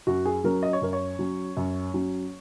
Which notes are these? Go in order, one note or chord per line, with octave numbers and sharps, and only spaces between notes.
F#2 F#4
G#4
F#3 C#4 A#4
D#5
C#5
F#2 A#4
C#5
F#3 C#4
F#2
F#3 C#4